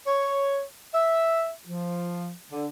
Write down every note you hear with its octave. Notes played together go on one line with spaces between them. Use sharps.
C#5
E5
F3
D3